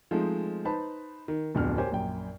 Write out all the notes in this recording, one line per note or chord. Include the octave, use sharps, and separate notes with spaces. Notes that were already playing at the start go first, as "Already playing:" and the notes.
F3 G#3 A3 C4 D#4
D#4 B4 C5 A5 B5
D#3
D1 F2 B3 D4 F6
G4 A#4 C5 C#5 G#5
A#1 F#2 G5